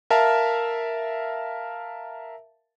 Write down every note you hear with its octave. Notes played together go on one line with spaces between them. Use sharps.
A#4 E5 F5 A5